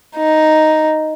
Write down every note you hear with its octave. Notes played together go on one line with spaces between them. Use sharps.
D#4